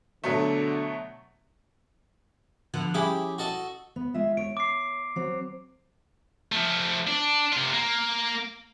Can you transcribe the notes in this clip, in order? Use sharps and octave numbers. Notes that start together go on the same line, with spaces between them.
B2 D3 F#3 A3
D3 F3 B3
C#4 E4 G4 G#4
F#4 A4 D#5
B3
G#3 F4 E5
C#5 D7
D6 C7
F#3 C4 C#5
F3 A3
D4
C3 F4
A#3